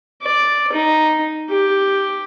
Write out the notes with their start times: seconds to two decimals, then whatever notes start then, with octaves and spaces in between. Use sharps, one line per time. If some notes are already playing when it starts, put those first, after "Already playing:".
0.23 D5
0.73 D#4
1.49 G4